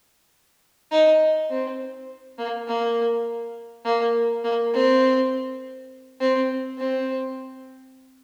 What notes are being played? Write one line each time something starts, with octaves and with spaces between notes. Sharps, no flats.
D#4
C4
A#3
A#3
A#3
A#3
C4
C4
C4